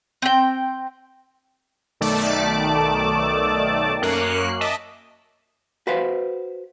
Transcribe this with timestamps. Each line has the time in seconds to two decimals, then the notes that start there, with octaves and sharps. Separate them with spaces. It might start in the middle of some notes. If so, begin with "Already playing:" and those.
0.22 C4 G5
2.00 B1 D#3 A3 D5 A5 D6
4.02 F#2 A#3 C#4 C#5 F#6 C7
4.61 D#5 E5 A5 D6 B6
5.87 F#4 B4 C5 F5